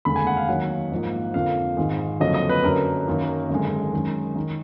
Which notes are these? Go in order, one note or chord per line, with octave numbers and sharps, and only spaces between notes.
F1 D#2 D3 G#3 B5
G#5
F#5
F5
D#2 D#3 F#3 F#5
A#1 G#2 F3 A#3
F2 D3 F3 A#3 F5
G#1 G#2 D#3 G#3
F#1 F2 D3 F#3 D#5
D#5
B4
F#2 D3 F#3 A#4
F#2 D#3 F#3 A#3
G#1 F#2 D3 G#3
F#2 D#3 G#3
D#3